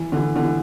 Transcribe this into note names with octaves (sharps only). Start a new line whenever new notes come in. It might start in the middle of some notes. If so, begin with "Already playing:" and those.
Already playing: E3
D3
E3
D3
E3